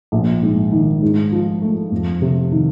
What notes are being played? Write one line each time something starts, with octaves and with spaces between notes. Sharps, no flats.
A#1
G#2
D#3
G#2
F3
A3
F2
C3
D#3